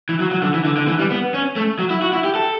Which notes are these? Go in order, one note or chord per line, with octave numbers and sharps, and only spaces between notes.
E3
F#3
F#3
D3
E3
D3
D3
E3
G3
B3
C#4
A3
F#3
E4
F#4
E4
G4
A4